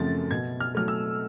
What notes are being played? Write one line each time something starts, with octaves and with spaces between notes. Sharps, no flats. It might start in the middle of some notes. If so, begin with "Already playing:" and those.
Already playing: F#2 C#3 F3 A3 C4 A6
B2 G#6
F6
F#3 A3 F6
E6